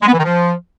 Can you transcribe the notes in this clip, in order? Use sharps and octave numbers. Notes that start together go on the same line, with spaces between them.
G#3
B3
E3
D#3
F3